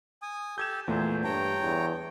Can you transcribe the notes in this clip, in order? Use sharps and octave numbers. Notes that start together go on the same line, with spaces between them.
G#5 D#6
G4 A4 G6 G#6 E7
E2 A#2 A3 C5
G2 C#5 G5 A5 A#5
E2